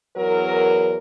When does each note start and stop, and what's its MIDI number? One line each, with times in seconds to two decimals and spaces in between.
0.16 0.98 40
0.16 0.98 54
0.16 0.98 70